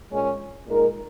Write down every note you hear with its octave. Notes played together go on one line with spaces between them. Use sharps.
A#2 G#3 C#4
A#2 G#3 D#4 A#4